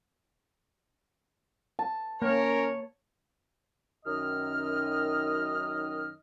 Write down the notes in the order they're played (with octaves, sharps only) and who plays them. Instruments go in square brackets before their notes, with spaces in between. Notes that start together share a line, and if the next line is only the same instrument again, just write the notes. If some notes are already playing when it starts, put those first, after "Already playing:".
[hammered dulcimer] A5
[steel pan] A#3 [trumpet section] C#4 A#4 [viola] C#5
[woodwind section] F#2 D#3 D#5 F6